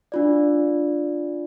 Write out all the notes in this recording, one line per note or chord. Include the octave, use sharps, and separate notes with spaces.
D4 F4 D5